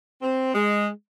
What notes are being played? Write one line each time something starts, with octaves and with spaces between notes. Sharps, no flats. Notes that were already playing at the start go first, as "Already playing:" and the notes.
C4
G#3